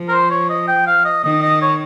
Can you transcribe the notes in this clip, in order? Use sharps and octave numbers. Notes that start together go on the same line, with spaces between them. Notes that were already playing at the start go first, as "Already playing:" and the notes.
Already playing: F3
A#4
C5
C#5
D#5
G5
F5
D#5
D#3 D#5
D#5
C#5